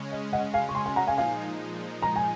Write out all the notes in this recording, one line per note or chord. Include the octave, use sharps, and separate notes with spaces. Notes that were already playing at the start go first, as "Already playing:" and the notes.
Already playing: C#3 G#3 C#4
D#5
D#5 F#5
F5 G#5
C#6
G#5 C6
G#5 C6
F#5 A#5
F5 G#5
A#2 F3 G#3 D#4 F5 G#5
A#5
G#5